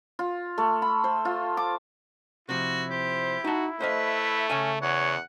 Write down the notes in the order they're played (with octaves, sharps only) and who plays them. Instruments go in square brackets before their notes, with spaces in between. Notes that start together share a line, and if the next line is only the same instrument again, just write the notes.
[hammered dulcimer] F4
A3
B5
C5
F4
D6
[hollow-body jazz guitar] C3 F3 [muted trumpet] E4 [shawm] F#4
[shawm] G4 [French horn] C5
[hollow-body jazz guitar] D#4 A5 [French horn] F#4
[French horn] A3 [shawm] B4 [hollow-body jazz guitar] C5 D#5 F5
[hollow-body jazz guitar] C#3 E5 G#5 [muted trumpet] C#4
[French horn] E2 [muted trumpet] C#5 [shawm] F#5